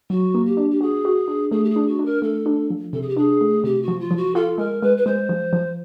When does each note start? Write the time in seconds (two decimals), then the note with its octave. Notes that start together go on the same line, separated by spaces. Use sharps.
0.10 F#3 F#4
0.35 A#3
0.46 G4
0.57 D4
0.70 G4
0.81 F#4 G#4
1.05 F#4
1.28 D4
1.51 A3 G#4
1.64 G4
1.69 G#4
1.76 D4
1.88 F#4
1.99 D4
2.05 A#4
2.22 A3 A4
2.46 D4
2.70 F3
2.93 C3 A4
3.02 G#4
3.08 G4
3.17 D4 G#4
3.41 A3
3.64 C3 G4
3.82 F#4
3.88 F3
3.99 F4
4.11 F3
4.17 F#4
4.35 F4 A4
4.58 G#3 A#4
4.82 G#3 B4
4.97 B4
5.06 G#3 C5
5.29 F3
5.53 F3